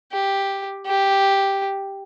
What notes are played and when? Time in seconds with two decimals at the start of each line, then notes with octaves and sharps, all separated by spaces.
0.13 G4
0.86 G4